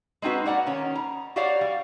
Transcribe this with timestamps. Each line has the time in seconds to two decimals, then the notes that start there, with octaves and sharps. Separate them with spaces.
0.22 G#3 C4 D#4 F#4 B4
0.46 A#3 D5 F#5 A#5
0.67 D#3 C#4
0.95 A#5
1.36 F#4 G4 C#5 D5 F5 F#5
1.61 G3